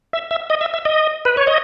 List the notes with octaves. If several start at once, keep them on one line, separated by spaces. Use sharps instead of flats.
E5
E5
D#5
E5
E5
D#5
B4
C#5
D#5